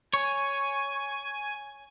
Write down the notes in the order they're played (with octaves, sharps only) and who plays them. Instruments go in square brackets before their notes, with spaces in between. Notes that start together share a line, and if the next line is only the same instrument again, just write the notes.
[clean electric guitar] C#5 [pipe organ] G#5